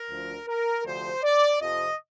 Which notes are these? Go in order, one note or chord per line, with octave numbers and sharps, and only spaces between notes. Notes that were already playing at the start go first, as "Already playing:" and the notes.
Already playing: A#4
D2 D3 F3
A#4
D2 C3 F3 C5
D5
F2 C3 F3 D#5